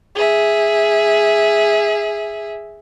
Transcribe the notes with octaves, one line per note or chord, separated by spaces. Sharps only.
G#4 E5